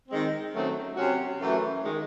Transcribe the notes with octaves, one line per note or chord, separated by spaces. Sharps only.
D#3 G#3 C4
F#2 D#3 F#3 A3 C4
C3 F#3 C#4 F#4
F#2 E3 A3
D#3 G#3